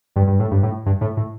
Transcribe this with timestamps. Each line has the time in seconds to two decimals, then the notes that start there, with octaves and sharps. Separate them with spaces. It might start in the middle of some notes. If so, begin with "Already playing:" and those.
0.16 G2
0.27 G2
0.40 A2
0.51 G2
0.63 A2
0.86 G2
1.01 A2
1.17 A2